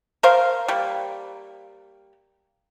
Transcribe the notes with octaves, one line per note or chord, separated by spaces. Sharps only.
A#4 C5 F5
G3 A#3